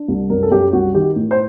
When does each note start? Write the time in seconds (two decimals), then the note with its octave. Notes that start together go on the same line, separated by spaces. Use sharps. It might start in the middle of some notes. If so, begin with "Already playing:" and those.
Already playing: D4
0.08 C2
0.30 F#2 A#4
0.43 A4
0.51 F#2 G4
0.73 C2 F#4
0.94 D#3 G4
1.16 A2
1.31 C5